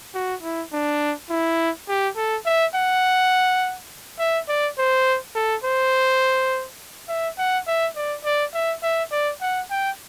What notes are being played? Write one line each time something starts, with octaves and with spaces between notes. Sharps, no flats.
F#4
E4
D4
E4
G4
A4
E5
F#5
E5
D5
C5
A4
C5
E5
F#5
E5
D5
D5
E5
E5
D5
F#5
G5